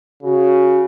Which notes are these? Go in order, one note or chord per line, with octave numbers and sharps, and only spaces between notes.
C#3 F#4